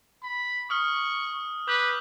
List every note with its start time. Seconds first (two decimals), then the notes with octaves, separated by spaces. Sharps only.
0.23 B5
0.70 C#6 D#6 F6 G7
1.68 B4 D6 G6 F#7